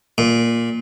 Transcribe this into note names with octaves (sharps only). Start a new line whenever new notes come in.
A#2